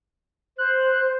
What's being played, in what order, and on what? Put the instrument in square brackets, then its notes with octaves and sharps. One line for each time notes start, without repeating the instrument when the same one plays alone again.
[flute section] C5 [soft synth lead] F#6